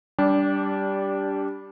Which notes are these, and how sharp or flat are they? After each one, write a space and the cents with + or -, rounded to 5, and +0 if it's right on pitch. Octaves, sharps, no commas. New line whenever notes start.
G3 +0 D4 -20 G4 +0